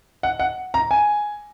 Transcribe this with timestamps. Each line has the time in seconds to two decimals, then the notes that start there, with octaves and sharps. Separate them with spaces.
0.23 F#5
0.40 F#5
0.74 A#5
0.91 G#5